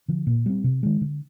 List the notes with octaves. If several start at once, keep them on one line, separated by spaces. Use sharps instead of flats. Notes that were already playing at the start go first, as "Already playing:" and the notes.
D3 F3
A#2
G3 C4
C3
D#3 G#3
D3